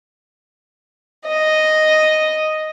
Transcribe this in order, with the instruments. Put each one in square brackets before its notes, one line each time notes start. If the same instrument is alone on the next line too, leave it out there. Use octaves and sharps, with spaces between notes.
[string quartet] D#5